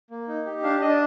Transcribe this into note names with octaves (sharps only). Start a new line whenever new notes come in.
A#3
D#4
G4
D4 F5
D4 D#5
D5